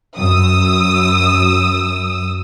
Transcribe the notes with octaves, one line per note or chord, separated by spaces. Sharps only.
F#2 D#6 E6